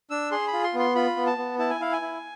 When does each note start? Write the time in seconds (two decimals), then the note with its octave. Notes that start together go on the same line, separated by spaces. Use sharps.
0.10 D4 E6
0.31 G#4 C6
0.48 B5
0.53 F4
0.64 C6
0.74 B3
0.79 C6
0.95 F4 B5
1.17 B3
1.27 A5
1.38 B3
1.59 E4 A5
1.70 G#5
1.80 E4 F5
1.93 G#5
2.01 E4